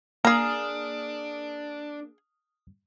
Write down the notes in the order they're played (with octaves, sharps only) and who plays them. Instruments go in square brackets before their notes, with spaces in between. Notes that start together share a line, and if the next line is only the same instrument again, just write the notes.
[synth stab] A#3 [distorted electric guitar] D4 [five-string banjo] G#4 A#5 [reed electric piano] D#6 F6